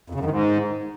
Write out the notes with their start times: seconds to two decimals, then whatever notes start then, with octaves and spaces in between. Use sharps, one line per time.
0.10 F2
0.15 C#3
0.20 F#2
0.25 D#3
0.30 G#2